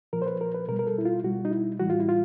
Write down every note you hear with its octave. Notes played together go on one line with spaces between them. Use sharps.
A#2 F3 A#4
C5
B4
A#4
B4
B2 G3 A#4
A#4
A4
E4
F4
B2 G3 F#4
D#4
E4
A2 E3 G3 F#4
F4
E4
F4